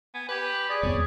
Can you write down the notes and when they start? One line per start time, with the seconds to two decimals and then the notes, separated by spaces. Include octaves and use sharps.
0.15 B3 G#5
0.29 G4 B4
0.69 G#4 D5
0.83 D#1 F2 B3 C#5